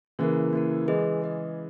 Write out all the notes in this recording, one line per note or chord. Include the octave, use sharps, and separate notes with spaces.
C#3 E3 A#3 E4 A#4
A#3 E4 A#4
E3 G#3 G#4 B4 D#5
G#4 B4 D#5